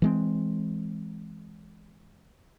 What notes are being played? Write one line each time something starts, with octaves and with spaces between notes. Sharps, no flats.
E3 G#3 C4